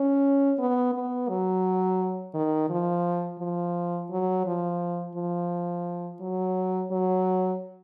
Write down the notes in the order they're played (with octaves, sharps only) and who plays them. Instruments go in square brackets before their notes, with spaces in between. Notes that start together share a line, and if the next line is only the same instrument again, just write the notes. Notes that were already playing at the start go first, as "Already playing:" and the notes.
Already playing: [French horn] C#4
B3
B3
F#3
D#3
F3
F3
F#3
F3
F3
F#3
F#3